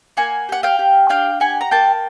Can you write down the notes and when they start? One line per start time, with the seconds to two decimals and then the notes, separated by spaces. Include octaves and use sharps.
0.17 A#3 F#5 G#5
0.49 G4 F#5
0.63 F5 G5
0.79 G4
1.09 D4 F5 G5
1.40 G4 F#5 G#5
1.61 A#5
1.71 A#3 G5 A5